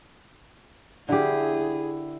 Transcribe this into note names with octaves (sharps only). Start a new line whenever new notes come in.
D3 E4 G4 G#4